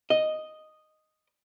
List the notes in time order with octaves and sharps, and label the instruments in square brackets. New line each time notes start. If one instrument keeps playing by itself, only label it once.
[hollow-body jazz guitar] D#5